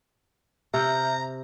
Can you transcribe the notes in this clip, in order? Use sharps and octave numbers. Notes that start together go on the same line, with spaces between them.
C3 E5 A#5 F6 G6